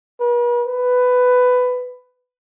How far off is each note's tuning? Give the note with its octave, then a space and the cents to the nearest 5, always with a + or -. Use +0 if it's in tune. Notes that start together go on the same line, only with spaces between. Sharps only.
B4 -45
B4 +15